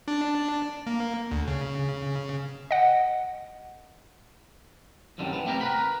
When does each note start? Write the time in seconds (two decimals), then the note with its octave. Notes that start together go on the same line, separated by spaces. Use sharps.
0.08 D4
0.87 A#3
1.31 D2
1.48 C#3
2.71 D#5 F#5
5.18 C2 F#2 D3 D#3 G3
5.33 E3 B3
5.46 C3 A3 B3 G4 A4 A#4
5.61 A#4 B4 B5